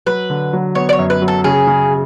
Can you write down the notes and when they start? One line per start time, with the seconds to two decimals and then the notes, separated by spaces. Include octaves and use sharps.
0.07 F#3 B4
0.30 D3
0.53 F#3
0.75 B3 C#5
0.89 D5
0.93 C#5
0.99 F#2
1.10 B4
1.22 F#3
1.28 A4
1.44 C#3 G#4
1.67 C#3